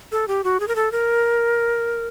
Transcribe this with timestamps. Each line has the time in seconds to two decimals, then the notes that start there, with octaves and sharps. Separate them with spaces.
0.12 A4
0.28 G4
0.44 F#4
0.60 G#4
0.68 A#4
0.76 A4
0.92 A#4